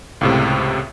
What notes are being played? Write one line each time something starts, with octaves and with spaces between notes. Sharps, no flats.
C#2 A2 C3